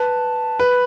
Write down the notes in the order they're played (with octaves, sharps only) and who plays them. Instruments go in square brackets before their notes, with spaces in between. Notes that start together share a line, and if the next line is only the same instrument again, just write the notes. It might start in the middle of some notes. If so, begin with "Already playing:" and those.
Already playing: [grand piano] B4 [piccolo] A5
[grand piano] B4 [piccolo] B5